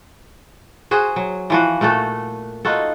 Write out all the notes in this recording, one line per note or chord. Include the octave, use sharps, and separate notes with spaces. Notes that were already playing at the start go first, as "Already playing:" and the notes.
F#4 G#4 C5
F#3
E3 F3 F#4
A#2 A3 F#4 A4
D#4 F4 F#4 A4